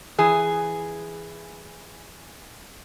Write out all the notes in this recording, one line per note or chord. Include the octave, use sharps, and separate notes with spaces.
E3 G#4